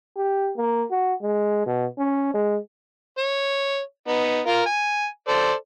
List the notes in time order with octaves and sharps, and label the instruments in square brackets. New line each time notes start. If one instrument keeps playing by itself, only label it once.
[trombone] G4
A#3
F#4
G#3
B2
C#4
G#3
[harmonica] C#5
B3 D#4
F4 A#4
G#5
A4 C5 D5